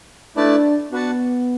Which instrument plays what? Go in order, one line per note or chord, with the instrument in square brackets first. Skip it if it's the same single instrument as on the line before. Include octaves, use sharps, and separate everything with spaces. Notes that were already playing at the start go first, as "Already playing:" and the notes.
[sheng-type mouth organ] A3 E4 B4 D5 A5 [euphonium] D4
[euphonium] B3 [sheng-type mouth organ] D4 F#4 B4 F#5 A5